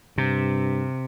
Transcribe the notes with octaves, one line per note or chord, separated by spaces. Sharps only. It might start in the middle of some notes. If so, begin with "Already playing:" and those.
G2 C3